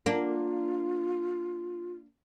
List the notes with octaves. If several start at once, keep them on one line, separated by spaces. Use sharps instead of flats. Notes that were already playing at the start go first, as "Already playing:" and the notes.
A#3 D4 F4